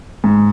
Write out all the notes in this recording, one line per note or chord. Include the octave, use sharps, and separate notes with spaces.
G#2